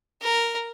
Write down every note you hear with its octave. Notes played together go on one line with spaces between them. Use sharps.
A#4